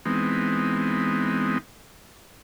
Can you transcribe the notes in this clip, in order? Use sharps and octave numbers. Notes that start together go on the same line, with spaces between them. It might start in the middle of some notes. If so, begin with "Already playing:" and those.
E3 G#3 B3 C4 D#4